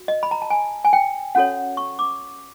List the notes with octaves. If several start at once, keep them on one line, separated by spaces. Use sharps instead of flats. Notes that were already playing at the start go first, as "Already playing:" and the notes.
Already playing: F#4
D#5
B5
A#5
A5
G#5
G#5
G5
C#4 F#4 A4 C#5 F#5
C#6
D6